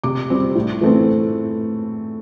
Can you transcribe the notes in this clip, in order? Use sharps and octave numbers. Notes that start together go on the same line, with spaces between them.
C3 D6
G3 C4
A2
E3 A3 C4